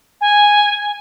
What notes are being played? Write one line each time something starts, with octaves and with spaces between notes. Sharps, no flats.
G#5